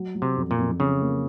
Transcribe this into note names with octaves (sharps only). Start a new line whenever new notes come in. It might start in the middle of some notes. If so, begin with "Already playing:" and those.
Already playing: F#3
F#3
C3
F2
A#2
F2
F2 C#3
A#3